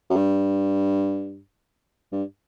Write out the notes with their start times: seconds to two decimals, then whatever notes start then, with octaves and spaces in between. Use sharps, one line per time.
0.10 F#2
0.16 G2
2.12 G2